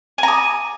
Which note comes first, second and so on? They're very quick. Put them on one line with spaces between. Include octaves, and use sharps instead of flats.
G#5 A#5 D#6